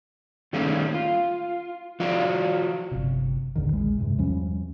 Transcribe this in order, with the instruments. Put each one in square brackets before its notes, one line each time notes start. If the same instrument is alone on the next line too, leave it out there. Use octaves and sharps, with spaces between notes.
[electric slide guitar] D#3 G3 A3 A#3 C#4 G#4
F4
F3 F4 F#4 D5 A#5
[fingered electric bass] G1 C3
A1 E2 D3 D#3
A#1 G#3
E2 G2 C3
E2 F3 G3 C#4